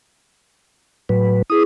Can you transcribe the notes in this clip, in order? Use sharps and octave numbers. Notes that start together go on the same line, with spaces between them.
A2 F#3 B4
E4 G#4 D#6